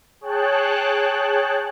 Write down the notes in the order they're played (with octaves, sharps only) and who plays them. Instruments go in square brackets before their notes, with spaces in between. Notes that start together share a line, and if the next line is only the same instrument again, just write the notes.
[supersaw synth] G#4 C#5 G5 A5 F#6